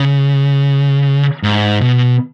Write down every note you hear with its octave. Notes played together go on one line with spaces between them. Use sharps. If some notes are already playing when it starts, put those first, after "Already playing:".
Already playing: C#3
G#2
B2